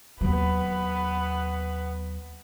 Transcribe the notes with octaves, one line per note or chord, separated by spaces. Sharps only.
D#2 F#3 B3 B4